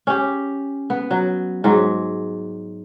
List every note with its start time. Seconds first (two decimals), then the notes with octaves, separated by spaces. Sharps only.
0.07 C#4 G4
0.90 B3
1.11 F#3
1.64 G#2 F#3